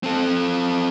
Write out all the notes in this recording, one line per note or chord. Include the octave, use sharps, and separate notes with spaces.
C4 A4